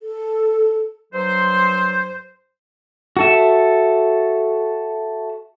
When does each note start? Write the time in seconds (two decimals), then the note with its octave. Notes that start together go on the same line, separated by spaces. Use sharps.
0.02 A4
1.13 G2 F#3 C5
3.17 F#4 A4 E5